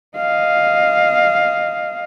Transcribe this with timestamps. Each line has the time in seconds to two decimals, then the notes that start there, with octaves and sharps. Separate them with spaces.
0.16 D#5 F5